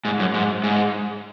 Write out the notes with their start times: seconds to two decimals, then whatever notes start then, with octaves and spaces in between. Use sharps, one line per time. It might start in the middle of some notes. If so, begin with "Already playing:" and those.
0.05 G#2
0.19 F#2
0.34 G#2
0.64 G#2